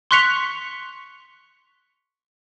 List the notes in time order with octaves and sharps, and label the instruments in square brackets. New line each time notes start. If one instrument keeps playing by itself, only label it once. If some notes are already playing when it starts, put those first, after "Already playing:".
[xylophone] C6 C#6 F#6 B6 C#7 F7